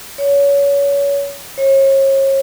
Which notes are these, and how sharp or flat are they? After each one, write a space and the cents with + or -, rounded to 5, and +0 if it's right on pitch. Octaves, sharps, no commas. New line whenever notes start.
C#5 +25
C#5 -35